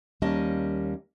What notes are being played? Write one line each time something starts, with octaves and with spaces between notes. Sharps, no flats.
D#2 G3 A#3 C#4 D#5 A5